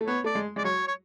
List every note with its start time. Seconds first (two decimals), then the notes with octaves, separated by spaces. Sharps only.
0.01 A3
0.07 B3 C#5
0.24 A3 D5
0.35 G#3
0.56 G#3 D5
0.64 F#3 C#5
0.88 C#5